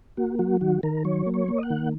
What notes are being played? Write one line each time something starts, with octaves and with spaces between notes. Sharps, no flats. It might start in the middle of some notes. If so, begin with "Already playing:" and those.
A#3 F#4
F#3 F#4
D#3 F#4
D#3 A#4
F#3 C#5
A#3
C#5
A#3
D#5
F#5
D#3